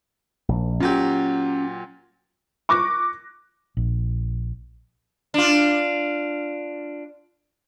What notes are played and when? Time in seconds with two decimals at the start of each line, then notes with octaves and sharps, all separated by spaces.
0.49 A#1
0.80 A#2 F#3 C#4 G4
2.69 C#6 D6 F#6 A#6
3.77 A#1
5.34 D4 F4